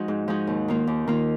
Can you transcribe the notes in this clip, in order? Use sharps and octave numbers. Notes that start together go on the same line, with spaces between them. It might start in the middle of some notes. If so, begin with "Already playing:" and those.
Already playing: F3 G#3 D#4 F#4
G#2
F3 G#3 D#4 F#4
D#2
D#3 A#3 F4
D#2
D#3 A#3 F4